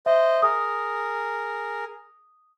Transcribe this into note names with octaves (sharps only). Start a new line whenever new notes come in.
C5 D#5 E5
G#4 A#4 D#6